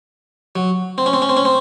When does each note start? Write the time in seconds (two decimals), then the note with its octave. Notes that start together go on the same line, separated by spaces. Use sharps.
0.56 F#3
0.98 C4
1.06 C#4
1.13 C4
1.22 C#4
1.29 C4
1.37 C#4
1.45 C4